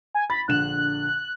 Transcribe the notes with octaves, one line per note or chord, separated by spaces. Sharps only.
G#5
B5 A6
A#1 D3 F#6 E7